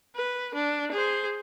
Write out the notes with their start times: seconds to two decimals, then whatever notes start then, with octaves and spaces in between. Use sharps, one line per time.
0.16 B4
0.54 D4
0.92 G#4 C5